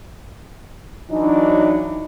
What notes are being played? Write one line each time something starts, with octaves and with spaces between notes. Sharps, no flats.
E3 F#3 D4 D#4